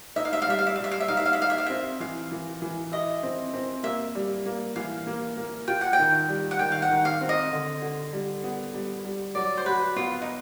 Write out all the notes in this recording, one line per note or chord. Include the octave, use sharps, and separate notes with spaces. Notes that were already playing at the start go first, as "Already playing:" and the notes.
D#4 E5
F5
E5
F5
G3 E5
F5
E5
G3 F5
E5
F5
E5
D#4 F5
E5
F5
E5
D#4 F5
E5
F5
C4 E5
E3 F5
E3
E3
E4 D#5
C4
C4
A#3 E5
G3
A#3
E3 F5
A#3
A#3
F4 G5
F#5
G5
D#3
G3
F#5
D#3 G5
F5
F#5
D#3
F5
C4
D#5
D3
D3
G3
B3
G3
G3
F#3 D5
C5
F#4 B4
B3 F4
D#4